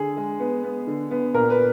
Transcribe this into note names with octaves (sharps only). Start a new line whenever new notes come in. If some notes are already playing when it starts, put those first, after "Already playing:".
Already playing: D3 G#4
G#3
B3
B3
D3
B3
A#2 A#4
B4